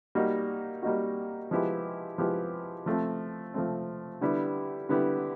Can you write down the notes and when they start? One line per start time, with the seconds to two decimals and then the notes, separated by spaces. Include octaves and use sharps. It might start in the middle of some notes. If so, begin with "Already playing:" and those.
0.15 G3 A#3 D#4 F#4
0.83 G3 A#3 D#4 F#4
1.51 F3 G#3 B3 E4 G4
2.18 F3 G#3 B3 E4 G4
2.86 F3 A3 C4
3.54 F3 A3 C4
4.21 D3 G3 B3 E4 G4
4.89 D3 G3 B3 E4 G4